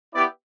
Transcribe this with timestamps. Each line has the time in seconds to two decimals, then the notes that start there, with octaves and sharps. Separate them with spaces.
0.14 B3 E4 G4 D5